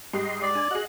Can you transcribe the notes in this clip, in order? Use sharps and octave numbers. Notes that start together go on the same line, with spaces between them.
G#2 G3 G4 D#5 C6
D5
D4 G#5
F#4 G#4 D#5 F#6